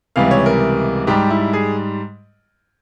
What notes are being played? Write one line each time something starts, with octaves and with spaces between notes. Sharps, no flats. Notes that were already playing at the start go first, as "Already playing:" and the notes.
C#2 C3 E3 G3 F5
C#5
A#4
G#2 G3 G4
E4
G#4